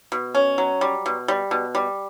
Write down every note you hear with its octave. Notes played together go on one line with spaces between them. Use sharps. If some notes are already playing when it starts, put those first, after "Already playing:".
B2
C#4
F#3
G3
B2
G3
B2
G3